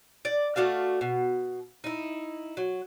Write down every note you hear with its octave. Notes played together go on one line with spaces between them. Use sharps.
D5
A3 D4 F#4 F5
B2
D#4 E4
F#3